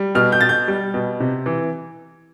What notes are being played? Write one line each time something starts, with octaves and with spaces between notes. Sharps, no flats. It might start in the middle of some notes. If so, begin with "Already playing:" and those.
Already playing: G3
B2 F6
G6
B2 A6
G6
G3
B2
C3
E3